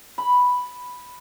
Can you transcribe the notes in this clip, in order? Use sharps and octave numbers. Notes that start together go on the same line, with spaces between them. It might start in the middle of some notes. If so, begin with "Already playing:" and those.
B5